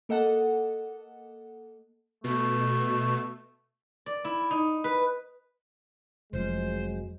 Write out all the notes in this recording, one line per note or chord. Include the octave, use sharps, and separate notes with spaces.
A#3 A4 D#5 F#5 A5
B2 A3
D5
E4
D#4
B4
F1 F2 F3 F#3 G#3 C5